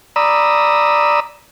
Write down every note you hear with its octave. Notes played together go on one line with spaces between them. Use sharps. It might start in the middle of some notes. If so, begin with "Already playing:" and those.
D5 A#5 B5 D#6 E6